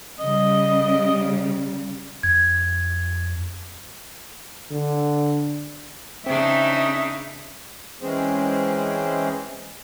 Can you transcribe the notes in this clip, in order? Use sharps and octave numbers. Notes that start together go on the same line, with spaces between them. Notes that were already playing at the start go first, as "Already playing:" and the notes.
C#3 G3 D#5
F2 G#6
D3
C#3 C4 D4 D#4 E5
E3 G#3 C4 C#4 G#4 C5